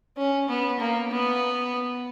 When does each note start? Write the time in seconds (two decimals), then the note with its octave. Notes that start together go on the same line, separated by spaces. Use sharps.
0.17 C#4
0.48 B3
0.80 A#3
1.10 B3